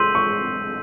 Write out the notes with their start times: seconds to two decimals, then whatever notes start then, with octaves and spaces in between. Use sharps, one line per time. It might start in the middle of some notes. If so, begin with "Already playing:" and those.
Already playing: C6 E6 G6 B6 D#7 F#7
0.15 C#6